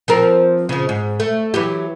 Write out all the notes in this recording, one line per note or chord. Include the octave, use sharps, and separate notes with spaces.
F3 C4 A#4
C#3 F3
G#2
A3
E3 F#3 G4